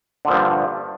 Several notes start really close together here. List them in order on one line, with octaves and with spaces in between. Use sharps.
D3 A#2 F3 G2